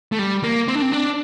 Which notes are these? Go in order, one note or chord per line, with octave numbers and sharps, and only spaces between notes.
A3
G3
A#3
C4
D4
C4
D4